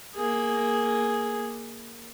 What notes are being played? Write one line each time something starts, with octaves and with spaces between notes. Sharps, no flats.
A#3 G#4